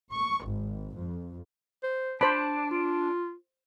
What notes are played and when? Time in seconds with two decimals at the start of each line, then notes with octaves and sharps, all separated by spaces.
0.14 C#6
0.45 G#1
0.95 F2
1.83 C5
2.21 D4 C5 A5 B5
2.71 F4